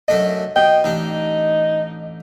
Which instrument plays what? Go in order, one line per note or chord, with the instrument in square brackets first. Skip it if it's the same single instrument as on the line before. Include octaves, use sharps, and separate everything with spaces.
[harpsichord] F#2 A3 D4 [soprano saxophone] D#5
[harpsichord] B2 [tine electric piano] D#5 [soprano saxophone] G5
[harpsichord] A1 D4 [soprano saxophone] D#4